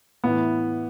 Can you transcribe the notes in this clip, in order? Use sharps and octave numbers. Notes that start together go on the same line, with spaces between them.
A2 E3 B3